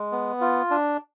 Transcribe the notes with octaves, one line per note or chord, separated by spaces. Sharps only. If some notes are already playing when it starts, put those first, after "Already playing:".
Already playing: G#3
B3
F4
D4